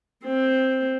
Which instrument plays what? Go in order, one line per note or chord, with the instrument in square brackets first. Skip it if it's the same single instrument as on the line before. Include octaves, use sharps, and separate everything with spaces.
[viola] C4